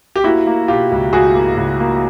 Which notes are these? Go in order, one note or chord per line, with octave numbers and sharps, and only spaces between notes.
G4
A#3 E4 F#4
A#3
B2 F4 G4
C#2
C#2 F#4 G#4
A#3
C#2
A#3